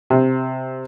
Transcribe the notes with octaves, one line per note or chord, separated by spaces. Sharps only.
C3